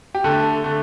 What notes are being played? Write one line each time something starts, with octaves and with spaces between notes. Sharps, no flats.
G4
D3 A3 A4
D3 A3